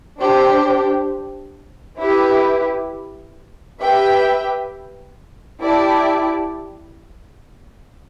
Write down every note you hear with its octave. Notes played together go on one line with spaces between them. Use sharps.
D4 G4 C5
E4 G4 B4
G4 B4 E5 G5
E4 G4 D5 A5